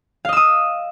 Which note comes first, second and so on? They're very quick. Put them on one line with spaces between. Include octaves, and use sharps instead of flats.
F5 D#5 E6 D#6